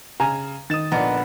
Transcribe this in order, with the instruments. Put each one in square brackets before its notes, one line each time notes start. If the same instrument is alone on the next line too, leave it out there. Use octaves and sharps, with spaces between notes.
[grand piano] C#3 [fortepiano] G#5 A#5
[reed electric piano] D#3 D#6 [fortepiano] D#4 [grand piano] A6 E7
[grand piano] A#1 A#2 D3 [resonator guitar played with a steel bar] B3 [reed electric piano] D5 D#5 A#5